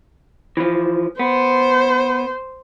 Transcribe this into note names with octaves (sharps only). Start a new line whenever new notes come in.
E3 F3
B3 C5